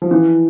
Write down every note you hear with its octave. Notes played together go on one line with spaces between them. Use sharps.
F3
E3